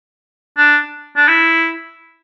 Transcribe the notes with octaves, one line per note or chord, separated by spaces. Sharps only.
D4
D4
E4